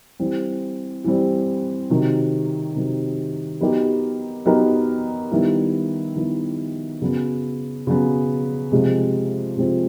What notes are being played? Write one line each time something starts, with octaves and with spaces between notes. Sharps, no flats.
E3 G3 C4
E3 G3 C4
C3 D#3 F#3
C3 D#3 F#3
F#3 B3 D#4 G4 A#4
F#3 B3 D#4 G4 A#4
D#3 G3 B3 E4
D#3 G3 B3 E4
C#3 F#3 B3
C#3 F#3 B3
C3 F3 G#3 C4 F4
C3 F3 G#3 C4 F4